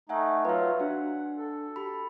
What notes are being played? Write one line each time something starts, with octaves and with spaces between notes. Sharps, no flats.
A3 D#4 E5 F#5 G#5
F#3 F4 B4 E5
D4 F#4 F#5
A4
G4 B5